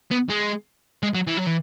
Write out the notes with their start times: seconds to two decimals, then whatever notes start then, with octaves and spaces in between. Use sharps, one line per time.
0.11 B3
0.29 G#3
1.03 G#3
1.15 F#3
1.27 E3
1.37 F#3
1.47 E3